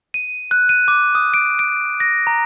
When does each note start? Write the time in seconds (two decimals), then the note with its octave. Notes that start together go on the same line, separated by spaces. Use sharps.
0.14 D#7
0.51 F#6
0.69 D#7
0.88 D6
1.15 D#6
1.34 D7
1.59 D7
2.00 A#6
2.27 A#5